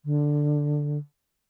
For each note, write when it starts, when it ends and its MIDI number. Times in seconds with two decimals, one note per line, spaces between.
0.05 0.98 50